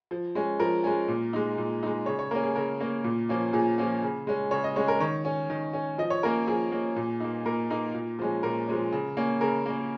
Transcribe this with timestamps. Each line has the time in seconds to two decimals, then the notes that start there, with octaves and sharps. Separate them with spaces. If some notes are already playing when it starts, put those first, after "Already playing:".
0.11 F3
0.35 G#3 C#4
0.59 F3 A#4
0.84 G#3 C#4
1.08 A#2
1.33 G#3 D#4
1.58 A#2
1.83 G#3 D#4
2.06 C#3 C#5
2.19 C#5
2.31 A#3 C#4 A#4
2.43 G#4
2.55 C#3 A#4
2.80 A#3 C#4
3.04 A#2
3.29 F3 A#3 C#4
3.53 A#2 G#4
3.78 F3 A#3 C#4
4.02 C#3
4.27 G#3 C#4
4.51 C#3 C#5
4.64 D#5
4.76 G#3 C#4 C#5
4.88 A#4
5.00 D#3 C#5
5.25 C#4
5.50 D#3
5.73 C#4
5.98 F3 D#5
6.10 C#5
6.23 A#3 C#4 A#4
6.47 F3 G#4
6.72 A#3 C#4
6.96 A#2
7.20 A#3 D#4
7.46 A#2 A#4
7.70 A#3 D#4
7.94 A#2
8.19 F3 G#3 C#4
8.43 A#2 A#4
8.67 F3 G#3 C#4
8.92 C#3
9.17 A#3 C#4
9.41 C#3 A#4
9.66 A#3 C#4